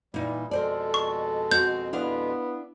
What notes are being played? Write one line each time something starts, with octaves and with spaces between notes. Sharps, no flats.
A#2 E3 G3 D#4
F2 B2 G#3 A4 A#4 C5 D5
C#6
C4 F#4 G6
B3 D4 E4 F5